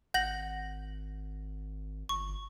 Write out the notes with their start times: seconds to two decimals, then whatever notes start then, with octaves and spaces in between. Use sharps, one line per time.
0.14 G#1 F#5 G6 A#6 F#7
2.09 G1 C#6